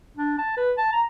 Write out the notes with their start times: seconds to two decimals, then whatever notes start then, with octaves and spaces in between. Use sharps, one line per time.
0.17 D4
0.38 A5
0.57 B4
0.78 A5
0.92 A#5